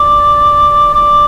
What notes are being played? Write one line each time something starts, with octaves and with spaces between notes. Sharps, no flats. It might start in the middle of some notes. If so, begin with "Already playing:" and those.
Already playing: D5
D5